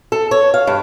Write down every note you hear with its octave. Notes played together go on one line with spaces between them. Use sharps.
A4
C#5
F5
G2